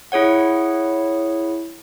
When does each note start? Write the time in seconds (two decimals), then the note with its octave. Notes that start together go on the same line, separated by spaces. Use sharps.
0.12 E4 G#4 C#5 F#5